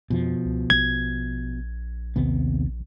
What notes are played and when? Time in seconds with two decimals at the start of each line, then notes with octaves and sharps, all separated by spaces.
0.10 F2 B2 F3
0.45 C#2
0.70 A#1 G#6
2.16 D#2 C3 B3